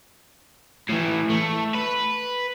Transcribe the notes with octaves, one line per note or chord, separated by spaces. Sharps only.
A2 E3
A3
B4